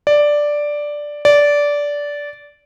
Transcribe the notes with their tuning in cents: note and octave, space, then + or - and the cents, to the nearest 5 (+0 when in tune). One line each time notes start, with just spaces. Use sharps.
D5 +0
D5 -15